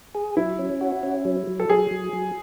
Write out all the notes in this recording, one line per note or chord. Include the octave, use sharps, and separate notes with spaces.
G#4
F#3 E4
C#4
F#4
C#4
F#3
F#3
A4
F#3 G#4
F#3
F#3